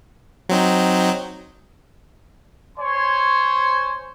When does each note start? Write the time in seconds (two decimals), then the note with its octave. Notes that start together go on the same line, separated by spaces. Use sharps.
0.49 F#3 C4 D#4
2.79 C5 C#5 G#5 C6